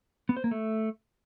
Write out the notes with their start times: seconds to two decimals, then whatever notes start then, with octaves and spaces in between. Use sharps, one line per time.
0.29 B3
0.37 C5
0.44 A#3
0.51 A3